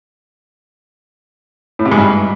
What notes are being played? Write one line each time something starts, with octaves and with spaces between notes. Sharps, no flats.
A2
C3
G#2
G2